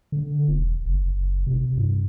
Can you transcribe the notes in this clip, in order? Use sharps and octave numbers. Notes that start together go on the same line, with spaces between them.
D3
E1
F#1
C3
G2